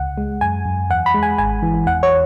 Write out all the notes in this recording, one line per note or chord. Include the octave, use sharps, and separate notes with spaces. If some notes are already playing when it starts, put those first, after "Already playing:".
Already playing: C#2 F#5
G#3
F#2 G#5
F#2
E2 F#5
B5
G#3
G#5
G#1 G#5
E3
E2 F#5
C#5